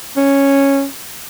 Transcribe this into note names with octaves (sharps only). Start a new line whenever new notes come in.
C#4